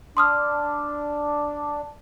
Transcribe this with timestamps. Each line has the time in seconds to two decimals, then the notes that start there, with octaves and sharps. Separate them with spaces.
0.17 D4 C6 D#6 F6